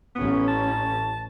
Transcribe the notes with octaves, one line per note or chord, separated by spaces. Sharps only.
A1 B3 C#4
A5